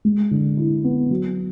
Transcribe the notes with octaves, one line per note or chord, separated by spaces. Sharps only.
G#3
D3
E4
B3
F#3